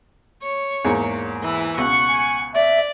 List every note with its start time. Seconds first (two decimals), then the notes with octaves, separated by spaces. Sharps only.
0.42 C#5
0.85 E2 G#2 A#3
1.42 E3 E4
1.78 C#2 B2 F#5 C#6
2.09 G#5
2.54 D5 E5